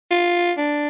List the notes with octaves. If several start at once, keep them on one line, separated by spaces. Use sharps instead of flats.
F4
D4